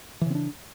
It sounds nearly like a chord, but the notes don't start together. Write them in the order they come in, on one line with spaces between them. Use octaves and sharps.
E3 C#3 C4 D4